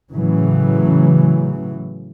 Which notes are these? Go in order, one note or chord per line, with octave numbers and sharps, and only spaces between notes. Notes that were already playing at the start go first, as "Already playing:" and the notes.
A2 C#3 E3 F#3